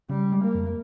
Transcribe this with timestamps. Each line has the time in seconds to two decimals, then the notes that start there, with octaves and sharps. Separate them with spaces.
0.09 C#3 G3
0.32 G#3
0.43 A#3
0.55 F2